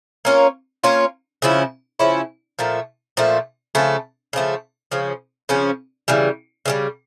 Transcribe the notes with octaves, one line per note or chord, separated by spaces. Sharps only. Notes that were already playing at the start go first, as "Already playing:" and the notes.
A#3 C#4 F4 C#5
A#3 C#4 F4 C#5
C#3 F3 C#4 E4
C#3 F3 C#4 E4
A#2 F3 A3
A#2 F3 A3
C#3 F3 A3
C#3 F3 A3
C#3 F3 C#4
C#3 F3 C#4
C#3 E3 G3
C#3 E3 G3